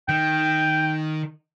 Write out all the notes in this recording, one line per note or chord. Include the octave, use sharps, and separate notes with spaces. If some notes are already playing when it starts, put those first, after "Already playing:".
D#3 G5